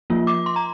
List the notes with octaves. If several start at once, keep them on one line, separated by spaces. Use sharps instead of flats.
F3 A#3 F4
D6
C6
A#5